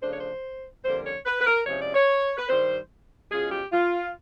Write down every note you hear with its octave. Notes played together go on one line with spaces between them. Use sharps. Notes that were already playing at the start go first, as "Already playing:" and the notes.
C#3 F3 A3 D4 C5
C#5
C5
F2 D3 G3 A#3 C5
C#5
B4
B4
A#4
C3 F3 G#3 C#4 E4 C#5
D5
C#5
B4
G2 D#3 G3 C5
B2 G#3 C#4 F4 G#4
G4
F4